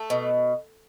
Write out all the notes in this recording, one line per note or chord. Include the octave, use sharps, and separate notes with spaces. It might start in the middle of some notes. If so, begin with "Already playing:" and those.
Already playing: A3
B2